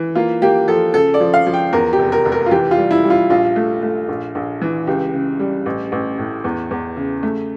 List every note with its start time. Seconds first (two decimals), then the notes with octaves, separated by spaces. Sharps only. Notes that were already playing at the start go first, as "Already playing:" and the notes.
Already playing: E3
0.15 A#3 F4
0.42 A#3 G4
0.68 F3 A4
0.94 C#3 A4
1.14 D5
1.20 F3
1.34 F5
1.47 F3
1.53 G5
1.73 E2 A#4
1.93 G4
1.99 F1
2.12 A#4
2.25 F1
2.32 A#4
2.46 F4
2.51 E3 G4
2.71 F4
2.78 G3
2.91 E4
3.04 G3
3.10 F4
3.30 A#1 F4
3.56 A3
3.82 A3
4.09 A#1
4.35 A#1
4.62 E3
4.87 C#2 G4
5.14 C#3
5.39 G3
5.66 A1
5.92 A1
6.18 A2
6.44 E2
6.71 E2
6.97 C#3
7.23 A3